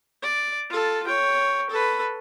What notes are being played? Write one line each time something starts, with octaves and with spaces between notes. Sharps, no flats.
D5
F4 A4
C#5 G5
A4 B4